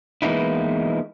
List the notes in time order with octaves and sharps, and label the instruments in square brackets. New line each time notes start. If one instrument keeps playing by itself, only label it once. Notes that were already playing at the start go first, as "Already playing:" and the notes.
[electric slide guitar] E3 G#3 A#3 B3 D#4 E4